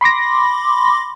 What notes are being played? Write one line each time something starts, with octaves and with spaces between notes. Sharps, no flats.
B5 C6 D6 A#6